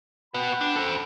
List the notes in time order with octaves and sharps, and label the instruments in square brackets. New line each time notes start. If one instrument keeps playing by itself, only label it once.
[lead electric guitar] F#4 B4 [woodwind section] F#5 G5 B5
[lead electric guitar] D4
A4 C5